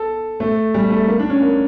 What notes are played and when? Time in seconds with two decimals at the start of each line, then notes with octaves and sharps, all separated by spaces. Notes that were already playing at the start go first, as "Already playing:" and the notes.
Already playing: A4
0.40 A3
0.74 G3
0.90 A3
1.07 A#3
1.19 D4
1.30 C#4
1.41 A#3